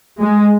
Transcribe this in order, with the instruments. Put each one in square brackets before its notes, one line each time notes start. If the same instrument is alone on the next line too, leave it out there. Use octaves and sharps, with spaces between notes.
[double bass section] G#3